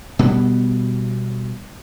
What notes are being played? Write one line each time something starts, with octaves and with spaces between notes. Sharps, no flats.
B2 G3 B3